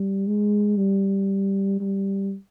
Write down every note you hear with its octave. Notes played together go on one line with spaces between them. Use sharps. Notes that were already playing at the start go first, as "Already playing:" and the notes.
Already playing: G3
G#3
G3
G3